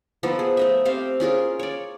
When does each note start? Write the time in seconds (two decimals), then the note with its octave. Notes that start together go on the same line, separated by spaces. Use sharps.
0.23 F3 B3 D#4 A4
0.39 G#4
0.57 A3 D#5 E5
0.85 C4 G4 C5 F5
1.20 C#4 F4 G#4 A#4
1.59 C#5 D5